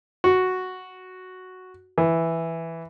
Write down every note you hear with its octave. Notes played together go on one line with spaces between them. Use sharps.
F#4
E3